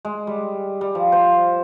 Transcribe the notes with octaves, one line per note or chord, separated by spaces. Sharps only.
G#3
G3
G3
F3
C5